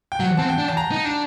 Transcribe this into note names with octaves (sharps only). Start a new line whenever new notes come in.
G5
F#3 F#5
C4 A5
G5
D4
A5
A#5
D#4
D4 A5